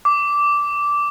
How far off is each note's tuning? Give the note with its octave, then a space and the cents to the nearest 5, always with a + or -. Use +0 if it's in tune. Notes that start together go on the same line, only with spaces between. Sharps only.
D6 -10